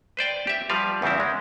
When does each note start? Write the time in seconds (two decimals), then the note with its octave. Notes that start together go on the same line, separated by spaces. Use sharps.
0.17 B4 C5 D5 G5
0.47 G4 E5
0.70 F3 G3 B4 F5
1.02 E2 C#3 G3 C4 E4
1.20 G#3